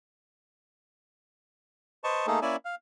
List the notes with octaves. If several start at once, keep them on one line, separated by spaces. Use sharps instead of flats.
B4 C5 D#5 A5 C#6
A3 A#3 D#4 G#4 A4
A#3 C#4 E4 D5 E5 G#5
F5